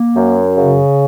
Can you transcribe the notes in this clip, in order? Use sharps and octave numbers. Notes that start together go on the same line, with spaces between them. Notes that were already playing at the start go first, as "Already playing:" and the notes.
Already playing: A#3
F#2
C#3